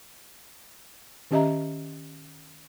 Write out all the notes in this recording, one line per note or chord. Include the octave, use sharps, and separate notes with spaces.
D#3 C#4 G4 D#5 E5 A#5